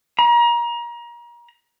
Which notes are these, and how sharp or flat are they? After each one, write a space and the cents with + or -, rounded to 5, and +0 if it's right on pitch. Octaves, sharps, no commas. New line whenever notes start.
A#5 +30